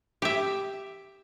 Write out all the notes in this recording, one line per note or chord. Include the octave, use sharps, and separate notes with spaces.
G4 E5